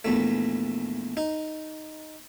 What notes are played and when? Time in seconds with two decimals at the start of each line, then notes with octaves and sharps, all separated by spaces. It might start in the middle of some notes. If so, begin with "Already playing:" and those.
0.05 A#1 E2 A3
1.17 D#4